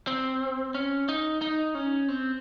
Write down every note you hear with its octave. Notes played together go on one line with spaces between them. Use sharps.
C4
C#4
D#4
D#4
C#4
C4